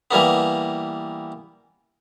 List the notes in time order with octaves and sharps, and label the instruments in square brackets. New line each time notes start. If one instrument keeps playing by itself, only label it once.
[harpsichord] E3 G3 A#3 B3